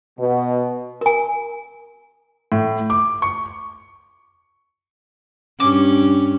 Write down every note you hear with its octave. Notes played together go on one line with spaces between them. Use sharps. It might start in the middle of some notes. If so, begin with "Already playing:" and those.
B2
A#4 G#5
A2
D6
C#6
G2 C#4 D6